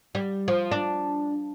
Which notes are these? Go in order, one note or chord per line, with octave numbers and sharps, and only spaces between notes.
G3
F3
D4